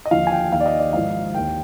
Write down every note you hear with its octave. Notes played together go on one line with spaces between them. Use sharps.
D#5
D#2 D3 F3 F5
G#5
G5
D#2 D#3 F5
D5
D#5
D5
G#1 G#2 F3 F5
D#2 D#3 G5